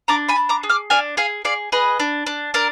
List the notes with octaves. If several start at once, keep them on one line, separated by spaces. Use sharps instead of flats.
D4 A#5 D6
G#5 B5
D4
A#5 D6
G#4
D6 F6
D4 F5 G#5
G#4 F5 G#5
G#4 D5 F5
G#4 B4 D#5
D4
D4
D4 A#4